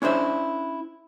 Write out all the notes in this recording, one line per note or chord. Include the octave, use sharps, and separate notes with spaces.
C#4 D4 E4 C5 E5